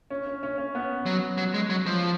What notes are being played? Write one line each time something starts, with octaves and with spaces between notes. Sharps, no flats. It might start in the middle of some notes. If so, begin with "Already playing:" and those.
C#4
C#4
C#4
C#4
B3
F#3
F#3
G#3
F#3
F3